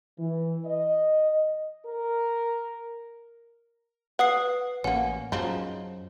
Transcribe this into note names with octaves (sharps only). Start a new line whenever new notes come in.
E3
D#5
A#4
B4 F#5 D#6 C7
A1 A#3 C#4 F#5
F#2 C#3 F3 D#4